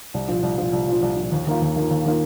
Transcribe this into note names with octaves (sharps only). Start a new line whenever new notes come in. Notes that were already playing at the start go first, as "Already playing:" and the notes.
C2
A#2 F3
C2
A#2 F3
C2
A#2 F3
C2
A#2 F3
D#2
D#3 A#3 F4
D#2
D#3 A#3 F4
D#2
D#3 A#3 F4